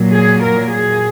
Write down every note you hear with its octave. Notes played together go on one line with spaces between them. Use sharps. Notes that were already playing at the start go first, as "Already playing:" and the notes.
Already playing: A#2 F#3 A#3
G#4
A#4
G#4